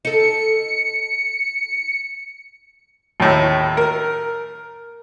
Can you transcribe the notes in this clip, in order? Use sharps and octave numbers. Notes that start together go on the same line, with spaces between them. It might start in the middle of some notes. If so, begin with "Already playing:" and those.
D#4 A4 C#7
D#2 A2
A#4